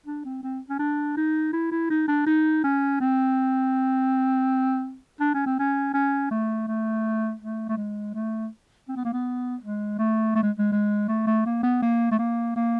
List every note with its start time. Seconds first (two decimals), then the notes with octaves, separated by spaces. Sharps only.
0.06 D4
0.25 C4
0.43 C4
0.69 C#4
0.79 D4
1.17 D#4
1.53 E4
1.71 E4
1.90 D#4
2.08 D4
2.26 D#4
2.64 C#4
3.00 C4
5.20 D4
5.34 C#4
5.46 C4
5.59 C#4
5.94 C#4
6.31 A3
6.68 A3
7.41 A3
7.69 A3
7.77 G#3
8.14 A3
8.89 C4
8.96 B3
9.05 A#3
9.13 B3
9.62 G#3
9.99 A3
10.35 A3
10.43 G#3
10.59 G#3
10.72 G#3
11.08 A3
11.27 A3
11.46 A#3
11.63 B3
11.82 A#3
12.12 A3
12.19 A#3
12.56 A#3